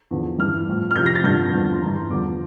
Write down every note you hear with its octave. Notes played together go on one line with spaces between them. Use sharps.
E2 D3 F3
G2 E3 F6
A2 F3
F6
F2 C3 F3 G6
A#6
A6
G2 D3 F3 G6
E2 D3 F3
C6
G2 E3 A#5
C6
E2 D3 F3 D6